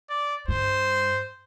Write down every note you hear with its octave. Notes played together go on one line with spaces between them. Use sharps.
D5
G2 C5